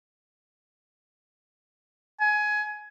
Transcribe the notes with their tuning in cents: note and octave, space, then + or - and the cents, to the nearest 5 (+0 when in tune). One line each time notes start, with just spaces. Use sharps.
G#5 +20